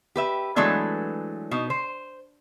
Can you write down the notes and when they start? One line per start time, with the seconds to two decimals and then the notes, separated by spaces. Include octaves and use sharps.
0.16 G4 B4 E5
0.56 E3 F#3 G#3 A3 B3 D4
1.51 B2 D#4
1.70 C5